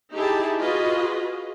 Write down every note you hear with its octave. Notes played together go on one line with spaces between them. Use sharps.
D#4 E4 G4 G#4 A5
F4 F#4 G#4 B4 D#5